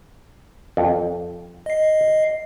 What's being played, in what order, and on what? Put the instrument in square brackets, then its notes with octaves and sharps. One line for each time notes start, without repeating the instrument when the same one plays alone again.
[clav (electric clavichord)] F2
[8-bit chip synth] D#5 C7